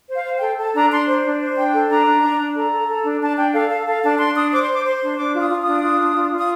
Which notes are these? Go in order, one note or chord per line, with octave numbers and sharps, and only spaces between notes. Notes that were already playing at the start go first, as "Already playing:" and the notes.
C5
F5
C5
A4 G5
A4 A5
D4 A#5
D4 C6
C5
D4
C5
D4 G5
A4
D4 A#5
D4
D4
D4
A4 A#5
A4
A4
D4
D4 A5
D4 G5
A4 F5
A4 F5
A4 F5
D4 A5
D4 C6
D4 D#6
C5 D6
C6
C5 D6
C5 C6
D4
D4 D6
F4
D#6
F4
D#6
D4
F4
D4
F4
F4
D#6